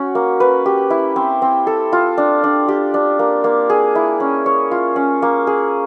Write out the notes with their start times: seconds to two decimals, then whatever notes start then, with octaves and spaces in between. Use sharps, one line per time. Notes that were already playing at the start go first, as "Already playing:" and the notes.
Already playing: C#4 F#4
0.15 A#3
0.40 B4
0.66 G4
0.90 E4
1.16 C4
1.42 C4
1.67 A4
1.92 F4
2.18 D4
2.44 D4
2.68 G4
2.94 D4
3.19 A#3
3.44 A#3
3.70 G#4
3.95 E4
4.20 C#4
4.46 C#5
4.71 F4
4.96 C#4
5.22 A#3
5.47 G#4